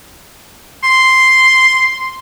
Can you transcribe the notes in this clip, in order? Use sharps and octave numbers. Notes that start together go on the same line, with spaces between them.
C6